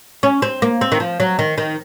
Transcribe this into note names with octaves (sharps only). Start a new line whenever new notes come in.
C#4
C4
A#3
C4
D#3
F3
F#3
D#3
D#3